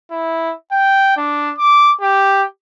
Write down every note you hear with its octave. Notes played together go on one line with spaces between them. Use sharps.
E4
G5
D4
D6
G4